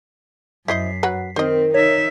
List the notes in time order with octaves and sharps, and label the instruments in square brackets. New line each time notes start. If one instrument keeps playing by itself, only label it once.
[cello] F#2 [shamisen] E4 C5 D#5 [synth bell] B6 C7
[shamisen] F#3 B4 F#5
[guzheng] D#3 [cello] C4 [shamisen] C5 D#5
[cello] D#4 E5 [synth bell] C#5